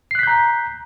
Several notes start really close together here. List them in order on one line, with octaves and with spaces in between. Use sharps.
C7 F#6 B6 G6 A#5